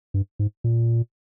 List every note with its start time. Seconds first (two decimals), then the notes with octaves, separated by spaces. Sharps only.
0.14 G2
0.39 G#2
0.64 A#2